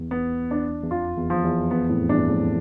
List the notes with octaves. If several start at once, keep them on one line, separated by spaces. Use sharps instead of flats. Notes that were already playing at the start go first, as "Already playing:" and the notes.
Already playing: E2
B3
D4
E2
F2 F4
E2
F3
E2
B3
F2 A2
E2 G2 D4
F2 A2